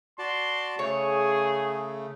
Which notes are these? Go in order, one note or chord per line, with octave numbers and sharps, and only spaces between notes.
F#4 D5 A5 C6
C#3 A3 G#4 C#5